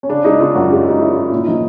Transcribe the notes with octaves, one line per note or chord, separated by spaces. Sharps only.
C#4
C#3 D4
G#3 D#4
C#3 F4
F#2 F#4
G#3 G4
G#3 D#4
G#3 E4
F4
G#3
A#2 E4
F3 D#4